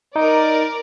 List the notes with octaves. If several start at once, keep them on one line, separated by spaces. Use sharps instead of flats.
D#4 A#4 D5